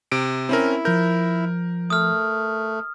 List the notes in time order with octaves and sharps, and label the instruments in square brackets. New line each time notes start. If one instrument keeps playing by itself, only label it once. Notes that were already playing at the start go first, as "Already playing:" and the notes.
[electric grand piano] C3 D7
[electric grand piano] C4 C#4 A#4 [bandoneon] E4
[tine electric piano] F3 G6 [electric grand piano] A#4
[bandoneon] A3 [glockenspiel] D#6 F6